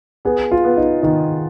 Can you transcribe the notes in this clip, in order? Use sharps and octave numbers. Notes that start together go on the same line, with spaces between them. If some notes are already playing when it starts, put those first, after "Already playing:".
B3 G#4
F4
B3
D#4
D#3 D#4